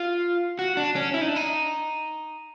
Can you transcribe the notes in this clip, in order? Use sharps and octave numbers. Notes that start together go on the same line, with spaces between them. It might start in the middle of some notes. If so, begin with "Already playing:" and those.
Already playing: F4
F#4
D4
C#4
E4
D#4
D4
D#4